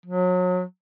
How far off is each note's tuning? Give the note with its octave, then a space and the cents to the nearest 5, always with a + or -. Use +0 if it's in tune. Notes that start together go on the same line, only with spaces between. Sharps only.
F#3 -30